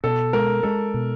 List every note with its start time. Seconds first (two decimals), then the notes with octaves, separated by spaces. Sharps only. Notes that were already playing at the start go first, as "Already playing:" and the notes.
0.04 B2 A4
0.33 G#3 A#4
0.63 G#3 A4
0.94 B2